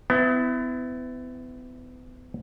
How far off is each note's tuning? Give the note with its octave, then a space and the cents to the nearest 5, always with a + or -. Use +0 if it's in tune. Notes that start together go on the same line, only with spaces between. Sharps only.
B3 +35 E4 +0